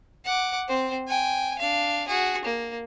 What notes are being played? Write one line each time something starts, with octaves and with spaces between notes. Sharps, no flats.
F#5 D6
C4 C5
G5 G#5
D4 F5
F#4 G#4
A#3